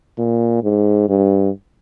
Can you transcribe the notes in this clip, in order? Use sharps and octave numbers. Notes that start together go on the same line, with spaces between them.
A#2
G#2
G2